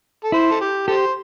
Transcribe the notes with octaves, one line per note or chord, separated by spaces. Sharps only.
A4
E4 C5
A4
G4
G4 A4 C5